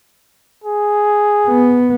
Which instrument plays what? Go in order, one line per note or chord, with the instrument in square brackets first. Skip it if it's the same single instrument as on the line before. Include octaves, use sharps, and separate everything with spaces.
[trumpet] G#4
[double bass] B3